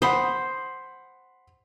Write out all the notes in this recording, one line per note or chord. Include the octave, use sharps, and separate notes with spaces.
C5 F#5 B5 D#6